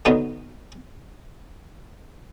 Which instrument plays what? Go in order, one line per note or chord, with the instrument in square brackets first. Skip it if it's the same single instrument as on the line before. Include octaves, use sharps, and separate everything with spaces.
[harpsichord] D3 F#3 B3 D#4